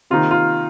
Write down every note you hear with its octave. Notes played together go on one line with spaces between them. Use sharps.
C3 D#3 A#3 D#4 F4
F4